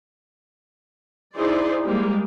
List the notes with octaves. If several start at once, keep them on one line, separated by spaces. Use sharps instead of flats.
D#4 E4 G#4 C5 D5
G3 G#3 A#3 G4